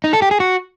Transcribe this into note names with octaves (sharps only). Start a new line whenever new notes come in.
D#4
A4
G4
G#4
F#4